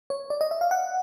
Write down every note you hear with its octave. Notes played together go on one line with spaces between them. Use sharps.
C#5
D5
D#5
E5
F5
F#5